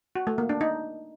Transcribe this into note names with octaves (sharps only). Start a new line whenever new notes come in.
F#4
A3
A#3
D4
D#4